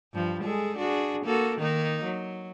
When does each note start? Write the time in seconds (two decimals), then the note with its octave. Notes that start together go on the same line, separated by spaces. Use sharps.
0.13 G2 F3
0.43 G#3 G#4 A4
0.76 D4 F#4 G#4
1.25 A#3 F#4 A4
1.58 D#3 A#3 D#4
2.04 F#3